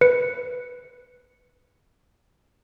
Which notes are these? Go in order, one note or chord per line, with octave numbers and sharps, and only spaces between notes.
B4 C#7